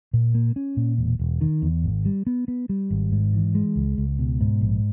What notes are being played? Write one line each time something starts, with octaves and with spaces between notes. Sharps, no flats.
A#2
A#3
C#4
A#2
E1
E1
D#3
E2
G#1
G3
B3
B3
G3
G#1
G#2
E3
G#3
C#2
C#2
B2
G#2
A#1